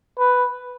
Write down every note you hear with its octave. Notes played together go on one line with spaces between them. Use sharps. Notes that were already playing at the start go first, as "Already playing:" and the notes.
B4